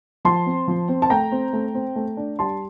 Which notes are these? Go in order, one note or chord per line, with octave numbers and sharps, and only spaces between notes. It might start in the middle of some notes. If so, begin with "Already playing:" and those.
F3 A5 C6
C4
F3
C4
A5
A3 G5 A#5
C4
A3
C4
A3
D4
G3 A5 C6